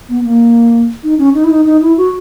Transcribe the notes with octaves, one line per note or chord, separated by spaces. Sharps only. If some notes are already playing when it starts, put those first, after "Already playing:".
B3
A#3
D#4
C#4
D#4
E4
D#4
D#4
E4
F#4